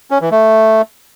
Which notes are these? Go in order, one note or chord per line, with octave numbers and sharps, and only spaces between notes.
C#4
E3
A3